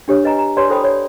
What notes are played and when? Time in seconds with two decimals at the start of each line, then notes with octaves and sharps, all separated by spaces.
0.08 D4 G4 C#5
0.24 B4 D#5 G#5 A#5
0.39 A#5
0.57 G4 B4 C#5 D5 G#5 C6
0.69 E4 A4 C5 G5 B5 D#6
0.84 C#5 D5